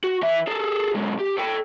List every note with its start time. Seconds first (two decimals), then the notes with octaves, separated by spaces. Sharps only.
0.04 F#4
0.23 E3 E5
0.47 G#4 A4
0.94 B1 G#3
1.19 G4
1.38 A4 G5